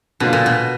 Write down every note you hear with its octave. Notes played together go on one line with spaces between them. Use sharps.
B2 D3 F#3 A#3 D4 F4
A#2
B2